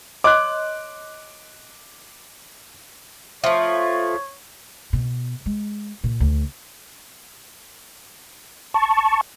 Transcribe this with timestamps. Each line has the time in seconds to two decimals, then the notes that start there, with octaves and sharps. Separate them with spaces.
0.24 C#5 D#5 C6 D6 F#6
3.44 F3 A3 C#5 E5
4.93 B2
5.46 G#3
6.04 A#2
6.20 D2
8.74 A5 C#6